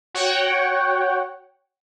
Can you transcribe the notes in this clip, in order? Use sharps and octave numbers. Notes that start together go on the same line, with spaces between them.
F#4 C#5 F#5 G5